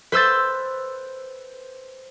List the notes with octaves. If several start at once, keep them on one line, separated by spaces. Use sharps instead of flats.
B4 C5 E6 G6 A6